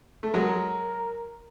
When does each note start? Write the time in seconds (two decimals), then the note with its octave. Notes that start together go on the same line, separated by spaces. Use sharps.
0.23 A3
0.33 F#3 G#3 A#4